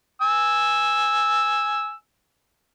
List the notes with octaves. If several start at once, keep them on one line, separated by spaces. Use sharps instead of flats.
G#5 E6